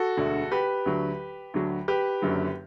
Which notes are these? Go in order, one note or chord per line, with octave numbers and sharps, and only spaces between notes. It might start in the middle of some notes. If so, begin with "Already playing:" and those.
Already playing: F#4 A4
E1 D2 D3
G4 B4
D2 D3 F#3
D2 D3 F#3
G4 B4
F#1 F#2 D3 F#3